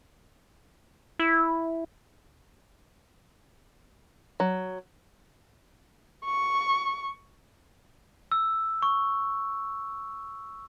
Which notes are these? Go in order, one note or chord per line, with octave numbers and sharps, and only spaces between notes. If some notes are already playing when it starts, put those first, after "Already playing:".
E4
F#3
C#6
E6
C#6